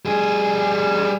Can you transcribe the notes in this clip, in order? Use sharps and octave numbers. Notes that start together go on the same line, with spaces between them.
G3 G#4